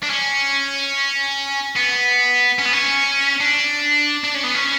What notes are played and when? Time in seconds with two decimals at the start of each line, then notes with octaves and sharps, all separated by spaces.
0.03 D4
0.10 C#4
1.76 B3
2.59 C#4
2.65 B3
2.73 C#4
3.41 D4
4.24 D4
4.34 C#4
4.44 B3
4.55 C#4